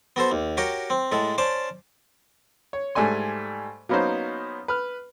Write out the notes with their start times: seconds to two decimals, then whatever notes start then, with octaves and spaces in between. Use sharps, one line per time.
0.16 B3 F#4 A4 C5
0.32 D#2
0.57 F#4 G4 A#4 C#5 G5
0.90 C4
1.12 A2 G#3 A4
1.38 C#4 C5 D5 A5
2.73 C#5
2.95 G#2 G3 A3 D5 G#5 C6
3.89 F#3 A#3 B3 C#4 D#4 C5
4.68 B4 F6